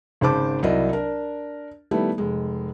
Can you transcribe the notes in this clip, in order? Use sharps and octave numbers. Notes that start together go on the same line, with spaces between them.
G#1 C#3 C5 A5 D6
C2 F#3 E4 D5 D#5
D4 A#4
D#3 G3 A3 B3 E4
F1 G#3